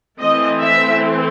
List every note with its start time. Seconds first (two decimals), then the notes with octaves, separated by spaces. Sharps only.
0.20 E3 A3 C4 D#5
0.63 E5